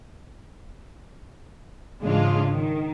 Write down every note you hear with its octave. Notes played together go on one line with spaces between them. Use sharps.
G#2 C#3 E3 G#3 D4 F4
D#3